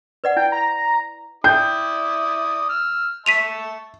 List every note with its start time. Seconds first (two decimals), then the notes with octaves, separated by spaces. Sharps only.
0.24 B4 D5 F#5
0.36 E4 G5
0.52 A#5
1.44 E4 D5 G5 D#6 G6
2.69 E6 F6
3.26 E5 A5 C#6 B6 D#7 F7